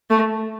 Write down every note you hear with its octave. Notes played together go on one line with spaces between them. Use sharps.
A3